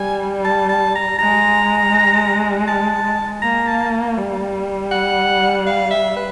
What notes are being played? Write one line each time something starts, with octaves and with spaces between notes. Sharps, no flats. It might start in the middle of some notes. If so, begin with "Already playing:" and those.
Already playing: G3 G#5
A5
A5
A#5
G#3 A#5
A5
A#3 A#5
A5
G3
F#5
F5
E5
B4